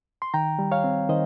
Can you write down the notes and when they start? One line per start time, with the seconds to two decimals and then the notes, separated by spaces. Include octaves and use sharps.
0.22 C6
0.34 D#3 G5 A#5
0.59 G3
0.72 C#5 F5
0.84 C4
1.09 D#3 C5 D#5